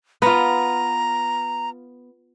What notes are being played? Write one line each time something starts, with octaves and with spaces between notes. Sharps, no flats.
B3 F4 A#5